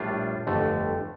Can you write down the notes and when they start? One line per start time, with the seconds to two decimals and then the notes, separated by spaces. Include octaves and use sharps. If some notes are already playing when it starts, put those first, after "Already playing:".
Already playing: A#1 A2 G3 D4 F4
0.47 G1 F2 D3 A3